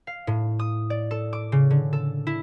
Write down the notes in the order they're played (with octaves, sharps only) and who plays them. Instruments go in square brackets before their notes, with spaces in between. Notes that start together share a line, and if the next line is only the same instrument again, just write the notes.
[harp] F5
A2
D#6
D5
A4
D6
C#3
D3
A4
E4